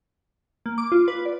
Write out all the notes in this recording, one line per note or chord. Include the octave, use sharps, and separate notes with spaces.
A#3
D6
F4
B4
D5